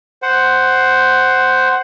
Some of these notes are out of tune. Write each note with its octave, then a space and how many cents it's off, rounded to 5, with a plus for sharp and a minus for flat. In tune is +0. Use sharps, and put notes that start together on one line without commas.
C5 +0 F#5 +10